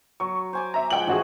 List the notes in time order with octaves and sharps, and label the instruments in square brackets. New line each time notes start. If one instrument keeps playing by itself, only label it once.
[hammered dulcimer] F#3 [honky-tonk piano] C#6
[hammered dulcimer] C5 G#5 D6
[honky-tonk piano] E5 A#5
[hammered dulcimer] F3 G#3 [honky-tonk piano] F#5 G5 F#7
[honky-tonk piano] A1 F#4 G#4 [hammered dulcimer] A3